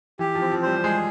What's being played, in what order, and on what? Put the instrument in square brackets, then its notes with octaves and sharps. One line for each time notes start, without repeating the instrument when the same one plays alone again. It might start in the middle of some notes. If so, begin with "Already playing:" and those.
[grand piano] E3 [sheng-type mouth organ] G4
[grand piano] F3
[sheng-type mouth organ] C4
[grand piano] F3
[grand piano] G3 [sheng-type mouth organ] C5
[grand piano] G#3 [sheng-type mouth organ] G#4